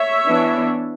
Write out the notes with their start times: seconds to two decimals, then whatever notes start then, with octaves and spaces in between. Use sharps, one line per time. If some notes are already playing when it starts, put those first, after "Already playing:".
Already playing: C#5 E5
0.26 E3 B3 D4